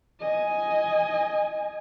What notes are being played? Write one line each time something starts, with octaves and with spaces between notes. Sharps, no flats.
D#5 G#5